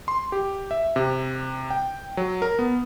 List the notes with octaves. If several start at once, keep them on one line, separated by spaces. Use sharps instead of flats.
C6
G4
E5
C3
G5
F#3
A#4
B3